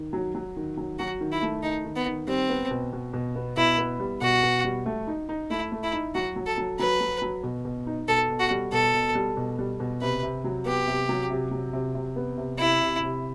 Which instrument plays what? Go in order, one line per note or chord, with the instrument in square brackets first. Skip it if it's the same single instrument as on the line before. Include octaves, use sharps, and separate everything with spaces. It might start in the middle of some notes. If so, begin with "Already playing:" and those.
Already playing: [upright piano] D#3
F#3
F#3
D#3
F#3
[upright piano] F#3 [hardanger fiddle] F#4
[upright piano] D#3
[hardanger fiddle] E4
[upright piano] A3
[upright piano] D#3 [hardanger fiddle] D#4
[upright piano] D#3
[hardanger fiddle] B3
[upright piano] D#3
[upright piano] G3 [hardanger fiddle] C4
[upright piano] B3
B2
B2
B2
B3
[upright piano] B2 [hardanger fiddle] E4
[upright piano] B3
G3
[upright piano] B2 [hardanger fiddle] F#4
[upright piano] B2
G3
A3
D#4
D#4
[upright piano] A3 [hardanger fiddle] E4
[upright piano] A3
[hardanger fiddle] E4
[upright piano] D#4
[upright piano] F#3 [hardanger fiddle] F#4
[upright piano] F#3
[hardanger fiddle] A4
[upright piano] F#3
[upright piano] F#3 [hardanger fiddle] B4
[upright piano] F#3
F#3
B2
B2
D#4
[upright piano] B2 [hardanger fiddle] A4
[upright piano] B2
[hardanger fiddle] F#4
[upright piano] G3
[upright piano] B2 [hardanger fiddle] A4
[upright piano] B2
G3
B2
G3
B2
[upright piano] C3 [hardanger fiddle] B4
[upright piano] C3
F#3
[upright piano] B3 [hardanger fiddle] G4
[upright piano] C3
F#3
C3
F#3
C3
C3
B3
C3
[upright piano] C3 [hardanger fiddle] E4
[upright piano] C3
C3